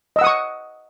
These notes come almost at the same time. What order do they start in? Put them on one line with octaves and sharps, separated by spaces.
D#5 E6 F#5 D#6 C#6